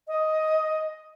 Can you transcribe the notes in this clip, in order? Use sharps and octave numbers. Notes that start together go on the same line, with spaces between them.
D#5